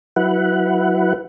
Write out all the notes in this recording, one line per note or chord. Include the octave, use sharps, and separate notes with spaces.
F#3 E4 B4 F#5